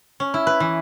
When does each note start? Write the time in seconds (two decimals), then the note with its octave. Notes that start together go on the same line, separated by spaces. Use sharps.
0.20 C#4
0.34 E4
0.47 B4
0.60 E3